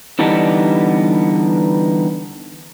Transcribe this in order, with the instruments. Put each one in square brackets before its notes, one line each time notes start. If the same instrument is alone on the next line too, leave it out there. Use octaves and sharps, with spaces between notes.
[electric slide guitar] D3 E3 G3 B3 D4 D#4